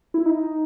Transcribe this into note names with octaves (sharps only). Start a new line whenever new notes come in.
E4
D#4